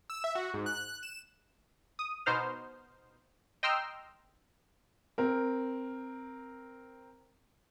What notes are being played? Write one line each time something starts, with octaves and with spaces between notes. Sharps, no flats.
E6
E5
F#4
G#2
F#6
E7
D#6
B2 D#4 C5 F6
D#5 G5 A#5 C6 E6 F6
C4 A#4